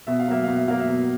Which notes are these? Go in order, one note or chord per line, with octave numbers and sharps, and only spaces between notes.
B2 E5
F5
F#3 A#3 E5
B2 F5
E5
F#3 A#3 F5
E5
B2